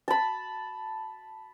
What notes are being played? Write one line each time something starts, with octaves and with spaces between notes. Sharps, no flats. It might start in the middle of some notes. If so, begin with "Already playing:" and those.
A5 B5